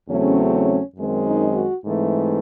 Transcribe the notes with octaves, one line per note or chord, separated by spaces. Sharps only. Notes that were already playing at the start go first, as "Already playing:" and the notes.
E2 C#3 F#3 A3 C4 C#4
C#4
F#2 D#3 G#3 C4
D#4
F#4
G#2 E3 A3 C4